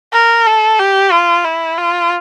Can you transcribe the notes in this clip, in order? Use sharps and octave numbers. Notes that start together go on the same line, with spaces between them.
A#4
A4
G4
F4
E4
F4